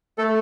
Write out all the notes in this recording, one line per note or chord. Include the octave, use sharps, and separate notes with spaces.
A3 A4